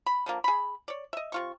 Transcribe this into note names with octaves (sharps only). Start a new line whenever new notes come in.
B5
D3 F3 A#3
G#4 B5
C#5 D5
D#5 E5
C3 F4 C#6